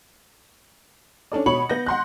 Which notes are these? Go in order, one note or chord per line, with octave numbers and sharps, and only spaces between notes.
C#4 D4 A4 D5
B2 C#5 B5 C#7 F#7
B3 G6 A#6
F#5 C6 F#6